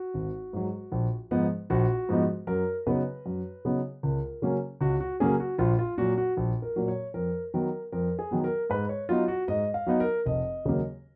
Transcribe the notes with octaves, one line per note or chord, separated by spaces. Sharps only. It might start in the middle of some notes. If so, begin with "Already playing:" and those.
Already playing: F#4
G#1
G#2 F#3
A#1
G#2 F3 B3 D#4
A#1 F#4
G#2 F3 B3 D#4
F#2 A#4
C#3 F#3 B3 D#4 B4
F#2
C#3 F#3 B3 D#4
C#2 A#4
C#3 F#3 A#3 C#4
C#2 F#4
F#4
C#3 F#3 A#3 C#4 G#4
F#4
A#1 F4
F4
A#2 F#3 F#4
F#4
A#1
A#4
A#2 F#3
C#5
F2 A#4
D#3 F#3 B3 A#4
F2 A#4
G#4
D#3 F#3 B3
A#4
G#2 B4
C#5
F#3 B3 D#4 F4
F#4
G#2 D#5
F5
F#3 B3 D#4
A#4
F1 D#5
D#2 C#3 F#3 A#3